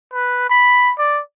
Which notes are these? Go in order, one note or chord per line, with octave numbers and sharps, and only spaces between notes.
B4
B5
D5